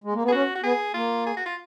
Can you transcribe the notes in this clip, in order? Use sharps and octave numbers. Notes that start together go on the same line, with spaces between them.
G#3
A#3
B3
G#4
C#4 F#4
F#4
B3 G#4
A#3 F4
G#4
F#4
F4